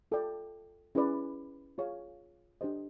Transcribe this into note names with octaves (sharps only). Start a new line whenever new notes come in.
F4 A4 D5 G5
C#4 E4 G#4 B4 D5
F4 G#4 C#5 F5
D4 G4 C5 D#5